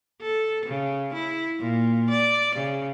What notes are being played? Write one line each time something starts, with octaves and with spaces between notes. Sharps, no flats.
A4
C#3
E4
A#2
D5
C#3